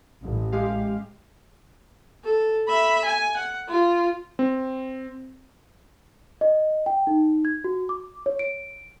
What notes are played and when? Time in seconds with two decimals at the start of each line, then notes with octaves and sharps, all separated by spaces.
0.23 A1
0.52 G#3 G4 F5
2.24 A4
2.68 E5 B5
3.05 G#5
3.37 F#5
3.69 F4
4.39 C4
6.41 D#5
6.86 G5
7.07 D#4
7.45 G#6
7.64 F#4
7.89 D6
8.26 C#5
8.39 D7